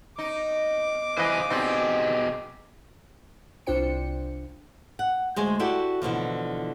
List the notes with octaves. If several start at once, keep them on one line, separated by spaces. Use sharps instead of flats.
D#4 D6
E3 B4 C5 D#5 F5 G#5
B2 C4 D#4 G4 G#4 D5
C2 D4 F4 C5 G5 C#7
F#5
D2 G#3 C5 G#5
E4 F#4 G4 A4 D5
B2 D3 E3 F3